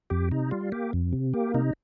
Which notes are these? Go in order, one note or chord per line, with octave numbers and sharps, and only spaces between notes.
F2 G4
C3 D#4
G3 F4
A#3 G4
F2
C3
A#3 G4
C3 D#4